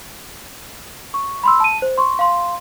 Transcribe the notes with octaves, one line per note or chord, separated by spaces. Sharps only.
C#6
B5 C6 E6
A5 D#7
C5
C6 C#6
F5 C6